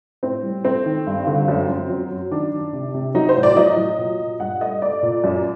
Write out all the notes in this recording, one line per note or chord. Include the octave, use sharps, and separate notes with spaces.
A2 C4
G3
A3 C4
D#3
G2
D3
F#2
F#2
F#3
F#2
D#3 D4
D#3
C3
C3
F#3 D#4
C5
A2
D5
F#3 D#5
F#3
A#2
A#2
G2 F#5
A3 D#5
A3 D5
A#2
F#2